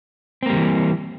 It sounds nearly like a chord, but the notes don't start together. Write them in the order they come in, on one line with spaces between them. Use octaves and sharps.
C4 A#3 G3 D3 E3